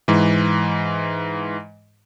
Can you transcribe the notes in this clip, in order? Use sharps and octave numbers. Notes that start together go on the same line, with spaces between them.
G#2 E3